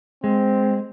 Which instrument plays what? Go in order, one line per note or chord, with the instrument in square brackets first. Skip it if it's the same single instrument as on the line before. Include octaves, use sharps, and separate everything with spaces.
[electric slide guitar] G#3 [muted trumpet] C4